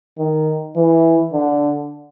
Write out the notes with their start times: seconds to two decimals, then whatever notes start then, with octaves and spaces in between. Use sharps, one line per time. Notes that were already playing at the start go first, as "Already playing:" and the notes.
0.18 D#3
0.76 E3
1.33 D3